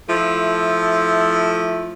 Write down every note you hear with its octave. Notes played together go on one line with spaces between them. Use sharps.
F3 A3 E4